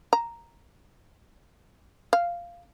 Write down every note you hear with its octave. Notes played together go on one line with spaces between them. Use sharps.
A#5
F5